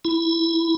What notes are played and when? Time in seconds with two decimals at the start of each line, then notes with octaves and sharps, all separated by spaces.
0.05 E4